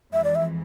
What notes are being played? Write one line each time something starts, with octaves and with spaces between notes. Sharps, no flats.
F2 E3 G#3 E5
D5
E5